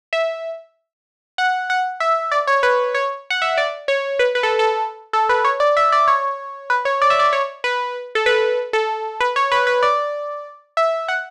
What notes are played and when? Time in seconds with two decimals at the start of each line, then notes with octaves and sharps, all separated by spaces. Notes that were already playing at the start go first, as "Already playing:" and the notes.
0.13 E5
1.38 F#5
1.70 F#5
2.00 E5
2.32 D5
2.47 C#5
2.63 B4
2.95 C#5
3.30 F#5
3.42 E5
3.58 D5
3.88 C#5
4.19 B4
4.35 B4
4.43 A4
4.59 A4
5.13 A4
5.29 B4
5.45 C#5
5.60 D5
5.77 E5
5.92 D5
6.08 C#5
6.70 B4
6.85 C#5
7.02 D5
7.10 E5
7.19 D5
7.33 C#5
7.64 B4
8.15 A4
8.26 B4
8.73 A4
9.21 B4
9.36 C#5
9.52 B4
9.67 B4
9.83 D5
10.77 E5
11.08 F#5